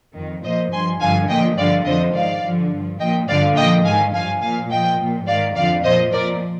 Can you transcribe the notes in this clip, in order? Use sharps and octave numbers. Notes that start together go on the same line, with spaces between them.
F2 D#3
A#2 F3 C5 D#5
G2 F3 G#5 C6
G2 D3 F3 F5 G#5
A#2 F3 D#5 G5
G2 D3 F3 D5 F5
F2 D3 F3 C5 D#5
G#2 D#3 D5 F5
G2 D3 F3
G2 F3
A#2 F3 D#5 G5
G2 D3 F3 D5 F5
A#2 F3 D#5 G5
G#2 D#3 F5 G#5
G2 F3 F5 G#5
A#2 F3 F5 G#5
A#2 F3 D#5 G5
A#2 F3
G#2 D#3 D5 F5
F2 D3 F3 D5 F5
A#2 F3 C5 D#5
A#2 F3 A#4 D5